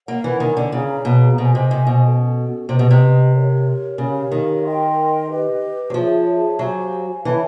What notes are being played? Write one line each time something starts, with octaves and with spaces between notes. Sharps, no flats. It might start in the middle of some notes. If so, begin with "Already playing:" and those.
A#3 A#4 C#5 F#5
E3
D#3
D3
C#3 G#4 C#5 F5 A#5
B2
B2 A4 C5 D#5 G#5
C3
C3
B2
C#4 F#4 A4
C3 G4 B4 D#5
B2
C3
G4 A#4 C#5
C#3 G4 A#4 C#5 F5
D#3
A#4 D#5 G5 C6
G4 B4 D#5
F#3
F3 G#4 C#5 E5 A5
F#3 G4 C5 F5 G#5
E3 A4 C#5 E5 A5